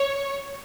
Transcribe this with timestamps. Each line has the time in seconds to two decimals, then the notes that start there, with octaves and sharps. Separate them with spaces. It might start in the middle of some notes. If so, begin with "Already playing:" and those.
Already playing: C#5